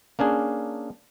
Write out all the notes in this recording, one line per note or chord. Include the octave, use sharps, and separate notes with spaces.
A#3 C#4 D4 G#4